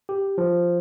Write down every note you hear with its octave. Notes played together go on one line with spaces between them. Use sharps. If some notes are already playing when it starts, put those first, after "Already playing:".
G4
F3